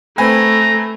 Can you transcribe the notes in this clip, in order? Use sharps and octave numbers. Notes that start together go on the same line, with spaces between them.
A3 C4 B4 G#5 A#5